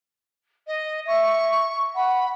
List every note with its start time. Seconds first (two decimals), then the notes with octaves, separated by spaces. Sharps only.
0.67 D#5
1.07 E5 C#6
1.96 F#5 B5